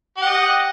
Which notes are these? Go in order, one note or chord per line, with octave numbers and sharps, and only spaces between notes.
G4 D#5 F#5